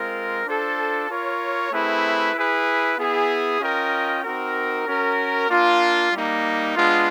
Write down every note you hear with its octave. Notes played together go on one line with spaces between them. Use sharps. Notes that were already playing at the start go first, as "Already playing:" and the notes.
Already playing: G#3 C4 F4 A#4
D4 F4 A4 C5
F4 A#4 C#5
A3 C4 E4 G#4 B4
E4 G#4 B4
B3 E4 G#4
C#4 F4 A#4 D#5 G5
C4 D#4 F#4 A#4
C#4 F#4 A#4
A#3 D4 F4
G3 A#3 D#4
G#3 B3 D4 F4